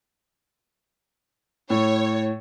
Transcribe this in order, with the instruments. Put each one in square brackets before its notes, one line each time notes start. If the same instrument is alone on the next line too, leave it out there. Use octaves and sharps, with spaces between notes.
[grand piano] A2 [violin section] C#5